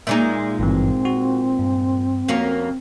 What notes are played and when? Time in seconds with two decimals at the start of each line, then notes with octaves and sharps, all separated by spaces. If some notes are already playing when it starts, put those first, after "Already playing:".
0.07 A#2 G#3 D#4 G#4 D5 E5
0.59 G#1 G2 E3 C4
1.05 F#4
1.59 G2
2.28 F2 A#3 C#4 F#4